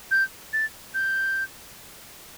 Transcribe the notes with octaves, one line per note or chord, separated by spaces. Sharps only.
G6
A6
G6